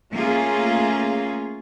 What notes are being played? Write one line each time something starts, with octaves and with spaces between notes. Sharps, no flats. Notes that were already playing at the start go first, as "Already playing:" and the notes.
A3 A#3 C#4 F4 G#4